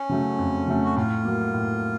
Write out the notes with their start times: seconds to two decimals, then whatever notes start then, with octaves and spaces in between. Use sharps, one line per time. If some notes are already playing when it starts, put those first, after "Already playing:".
Already playing: C#4
0.09 C#3 F#3 A3
0.39 F2
0.68 C#3 F#3 A3
0.85 F#4
0.96 A2 F4
1.25 F#3 A#3
1.54 A2